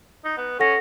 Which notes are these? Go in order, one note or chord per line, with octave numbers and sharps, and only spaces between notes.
D#4
B3
C#4 A4 F#5 A#6